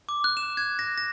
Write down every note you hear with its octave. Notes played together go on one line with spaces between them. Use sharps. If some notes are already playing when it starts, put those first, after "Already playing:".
D6
F#6
E7
G#6
A#6
A#6